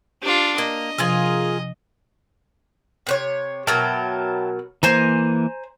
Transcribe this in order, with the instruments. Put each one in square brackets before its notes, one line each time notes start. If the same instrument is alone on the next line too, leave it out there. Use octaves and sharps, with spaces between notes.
[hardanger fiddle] D4 F4 [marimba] G4
[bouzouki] A#3 [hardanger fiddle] D#5
[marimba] C3 F3 [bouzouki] F4 G#4 A#4
[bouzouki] C3 B4 C#5
[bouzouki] B2 F#3 A#4 [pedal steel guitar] E5 G5 A5
[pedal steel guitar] E3 A#3 [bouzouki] C5 G#5 A#5